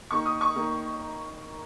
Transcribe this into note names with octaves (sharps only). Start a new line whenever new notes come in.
D#3 A#3 C#6
D#6
C#6
D#3 A#3